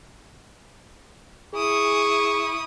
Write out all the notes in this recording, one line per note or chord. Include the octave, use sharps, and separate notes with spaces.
E4 G#4 C#6 D#6